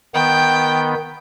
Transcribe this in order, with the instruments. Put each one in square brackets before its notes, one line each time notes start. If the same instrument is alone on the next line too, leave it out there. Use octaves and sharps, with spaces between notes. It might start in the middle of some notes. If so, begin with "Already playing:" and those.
[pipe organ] D#3 B3 [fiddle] G5